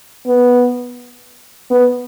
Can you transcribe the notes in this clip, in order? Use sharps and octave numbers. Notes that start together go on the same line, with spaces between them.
B3
B3